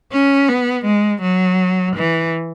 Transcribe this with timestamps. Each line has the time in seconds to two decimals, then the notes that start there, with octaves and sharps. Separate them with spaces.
0.12 C#4
0.49 B3
0.85 G#3
1.22 F#3
1.96 E3